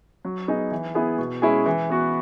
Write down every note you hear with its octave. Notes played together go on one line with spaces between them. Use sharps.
F#3
B3 D#4 G#4
E3
B3 E4 G#4
B2
G#3 C#4 E4 G#4
E3
B3 F#4